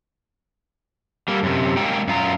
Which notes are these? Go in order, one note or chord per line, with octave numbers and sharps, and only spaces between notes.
G3 A#3
F#2 C3
G#3 A#3 D#4 G5
F#2 F4 A#5